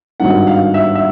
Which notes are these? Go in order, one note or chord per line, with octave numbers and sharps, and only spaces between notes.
G#1 G2 D#3 F#5
F5
E5
E5